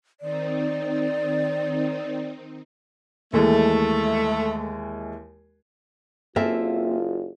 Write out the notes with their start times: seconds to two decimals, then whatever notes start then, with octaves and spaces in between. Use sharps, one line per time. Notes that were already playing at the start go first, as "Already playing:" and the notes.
0.20 D#3 C4 D#4 D5
3.33 D#2 E3 G#3 A3
6.36 F#1 A#3 C4 F4 A4 E5 G#5